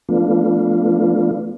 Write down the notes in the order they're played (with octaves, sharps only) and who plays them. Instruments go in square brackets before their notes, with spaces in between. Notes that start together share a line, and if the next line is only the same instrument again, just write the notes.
[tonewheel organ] F3 A3 B3 D4 F4